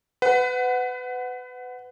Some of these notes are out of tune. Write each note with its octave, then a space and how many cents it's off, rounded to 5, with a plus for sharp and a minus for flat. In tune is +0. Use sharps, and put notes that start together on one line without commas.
B4 +30 F#5 +0